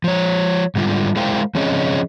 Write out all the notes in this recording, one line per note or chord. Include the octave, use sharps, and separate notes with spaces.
F3 C#5
G#2 D3 G3 F4
G#3 E4 A#4 C5 F5 G5
F3 C4 C#4 G#4 C#5 D#5